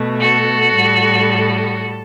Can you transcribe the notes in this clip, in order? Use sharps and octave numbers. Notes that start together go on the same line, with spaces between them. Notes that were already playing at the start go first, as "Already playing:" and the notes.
Already playing: B2 A3
F#4 A4
A2 G3